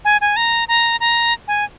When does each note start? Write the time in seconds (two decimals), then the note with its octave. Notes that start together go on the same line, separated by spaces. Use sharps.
0.05 G#5
0.21 G#5
0.36 A#5
0.68 A#5
1.00 A#5
1.48 G#5